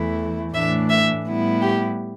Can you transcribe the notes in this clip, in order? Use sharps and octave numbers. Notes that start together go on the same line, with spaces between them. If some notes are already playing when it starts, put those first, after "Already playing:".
Already playing: E2 E3 A3 E4
A2 E3 A3 D4 E5
E5
A2 G3 B3 E4
G4